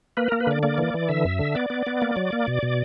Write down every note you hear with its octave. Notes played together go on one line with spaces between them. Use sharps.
A#3 B4
A#3 A#4
B4
D3 D5
A#3 D5
E3
E3
D3 E5
F#2
D3
B3 D5
B3
B3
A#3
F#3
A#3
B2
B2